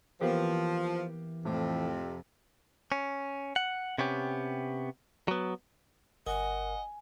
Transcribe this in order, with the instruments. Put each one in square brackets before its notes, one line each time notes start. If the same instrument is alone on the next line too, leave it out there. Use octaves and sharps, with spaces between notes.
[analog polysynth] E3 [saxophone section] F3 [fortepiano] A#3 B3 G4
[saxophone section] F2 C3 [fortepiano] A2
[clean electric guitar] C#4
F#5
C3 B3 C#4 G4
F#3 B3
[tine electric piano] G1 A#4 [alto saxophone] D#5 [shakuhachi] F#5 [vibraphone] G#5